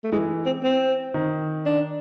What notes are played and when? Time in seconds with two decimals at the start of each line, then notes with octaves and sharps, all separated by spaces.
0.04 A3
0.12 E3 G#3
0.46 C4
0.64 C4
1.14 D#3
1.66 D4